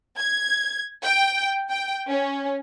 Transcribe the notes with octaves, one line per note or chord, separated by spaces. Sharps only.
G#6
G5
G5
C#4